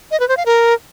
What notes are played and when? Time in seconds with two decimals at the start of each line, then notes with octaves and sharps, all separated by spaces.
0.11 D#5
0.20 B4
0.28 C5
0.37 F5
0.46 A#4